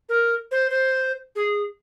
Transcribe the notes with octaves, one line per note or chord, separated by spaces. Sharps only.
A#4
C5
C5
G#4